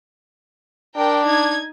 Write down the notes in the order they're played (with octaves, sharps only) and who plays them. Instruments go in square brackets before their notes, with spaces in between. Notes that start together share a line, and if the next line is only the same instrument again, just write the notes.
[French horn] D4 [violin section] A#4 G5
[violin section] D#4 G#6